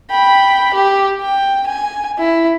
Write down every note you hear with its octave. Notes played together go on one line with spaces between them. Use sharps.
G5 B5
G4
G5
G#5
E4